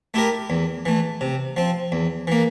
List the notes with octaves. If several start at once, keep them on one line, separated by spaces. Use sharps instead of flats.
A3 E4 G4 A#4
E2
E3 A3
C3
F3 C4
E2
E3 A#3